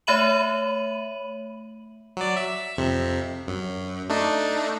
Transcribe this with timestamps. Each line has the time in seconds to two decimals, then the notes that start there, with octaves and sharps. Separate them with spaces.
0.07 A3 C#5 E5 B5 D#7 F#7
2.17 F#3 D5
2.37 E5
2.77 F2 C3
3.47 F#2
4.10 A3 D4 D#4